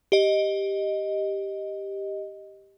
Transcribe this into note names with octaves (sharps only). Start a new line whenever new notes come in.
G4 D#5